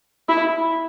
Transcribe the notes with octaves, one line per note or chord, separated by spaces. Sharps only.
E4